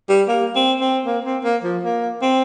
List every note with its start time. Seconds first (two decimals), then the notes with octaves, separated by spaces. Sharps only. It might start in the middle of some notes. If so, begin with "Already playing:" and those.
0.09 G3
0.28 A#3
0.55 C4
0.80 C4
1.05 A#3
1.25 C4
1.44 A#3
1.64 F3
1.83 A#3
2.21 C4